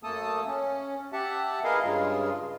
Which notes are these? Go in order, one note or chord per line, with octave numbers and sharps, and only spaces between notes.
F#2 A3 A#3 A4 A5 D#6
C#4
G4 E5 F#5 A5
B3 E4 G#4 A#4 D#5 F5
G2 C#3 G#3 F4